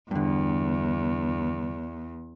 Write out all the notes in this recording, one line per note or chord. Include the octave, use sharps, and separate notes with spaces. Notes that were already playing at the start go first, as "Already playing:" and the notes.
E2 G2 D3